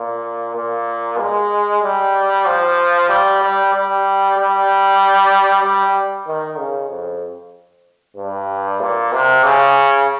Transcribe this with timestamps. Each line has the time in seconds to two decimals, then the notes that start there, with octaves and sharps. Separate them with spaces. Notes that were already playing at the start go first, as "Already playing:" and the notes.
Already playing: A#2
0.55 A#2
1.19 G#3
1.83 G3
2.46 F3
3.10 G3
3.41 G3
3.74 G3
4.37 G3
5.63 G3
6.27 D#3
6.58 C#3
6.90 F2
8.17 G2
8.80 A#2
9.12 C3
9.44 C#3